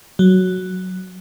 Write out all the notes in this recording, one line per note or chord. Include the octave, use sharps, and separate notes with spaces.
F#3